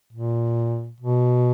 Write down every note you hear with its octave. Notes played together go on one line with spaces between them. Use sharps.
A#2
B2